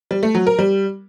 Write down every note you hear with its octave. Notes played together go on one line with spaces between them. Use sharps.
G3
A3
F#3
A#4
G3